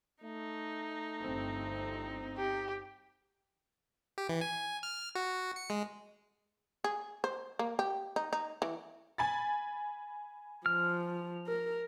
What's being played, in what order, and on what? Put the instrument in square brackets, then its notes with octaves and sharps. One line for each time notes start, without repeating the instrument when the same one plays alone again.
[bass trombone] A3 [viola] D#4
[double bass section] G1 G2 C4
[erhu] G4
[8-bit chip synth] G4
E3
G#5
F6
F#4
C#7
G#3
[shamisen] G#4
C5
A#3
G4
D#4
D#4
E3
[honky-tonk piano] G#5 B5 A6
[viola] F3 [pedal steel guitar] F6
[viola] A#4